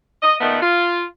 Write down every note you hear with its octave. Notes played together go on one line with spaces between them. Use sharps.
D#5
A#2 D#3 A3 B3
F4